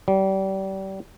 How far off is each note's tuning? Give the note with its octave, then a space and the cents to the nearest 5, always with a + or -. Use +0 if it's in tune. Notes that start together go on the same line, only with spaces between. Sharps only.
G3 -30